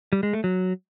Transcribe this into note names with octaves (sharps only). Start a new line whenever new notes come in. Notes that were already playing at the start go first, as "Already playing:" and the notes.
G3
G#3
A3
F#3